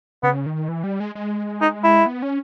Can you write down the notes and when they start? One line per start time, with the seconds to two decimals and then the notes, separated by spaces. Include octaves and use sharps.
0.23 C#3 B3
0.46 D#3
0.68 E3
0.84 G3
1.00 G#3
1.15 G#3
1.61 D#4
1.83 E4
2.06 B3
2.22 C#4